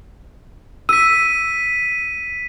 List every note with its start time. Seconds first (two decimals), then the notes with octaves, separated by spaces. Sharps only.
0.89 E6 B6 D#7